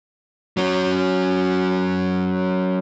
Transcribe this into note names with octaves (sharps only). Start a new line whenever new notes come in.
F#3 C#4